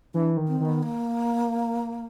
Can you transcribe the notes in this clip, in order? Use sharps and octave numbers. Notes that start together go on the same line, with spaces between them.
E3 D4
D#3
C4
D#3 B3
A#3